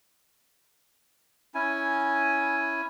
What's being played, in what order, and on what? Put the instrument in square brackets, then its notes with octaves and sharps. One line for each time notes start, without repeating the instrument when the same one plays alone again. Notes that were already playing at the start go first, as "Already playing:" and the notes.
[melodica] C#4 E4 G#5